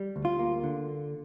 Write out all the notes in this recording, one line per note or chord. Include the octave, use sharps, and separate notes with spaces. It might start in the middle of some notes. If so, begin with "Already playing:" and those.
Already playing: G3
D2
F4
A#3
D3